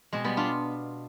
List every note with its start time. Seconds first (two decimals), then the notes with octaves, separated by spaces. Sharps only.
0.13 B2 G#3 C4
0.24 G3 B3
0.37 D4 F4